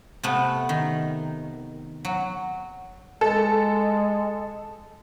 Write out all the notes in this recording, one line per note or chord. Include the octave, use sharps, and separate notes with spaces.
C3 A3 B3
D#3
F#3
G#3 A4